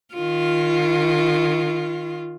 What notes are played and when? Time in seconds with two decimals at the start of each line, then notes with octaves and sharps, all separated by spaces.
0.14 D#3 F4